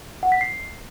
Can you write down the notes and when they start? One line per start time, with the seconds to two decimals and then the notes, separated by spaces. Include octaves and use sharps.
0.23 F#5
0.32 B6
0.41 C7